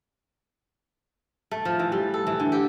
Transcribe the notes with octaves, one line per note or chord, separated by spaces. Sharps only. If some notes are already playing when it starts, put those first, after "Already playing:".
A3
F3
E3
G3
A4
E3
D3
G4